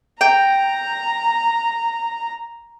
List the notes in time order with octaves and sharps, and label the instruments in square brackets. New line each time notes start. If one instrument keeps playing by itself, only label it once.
[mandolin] G5 [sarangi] A#5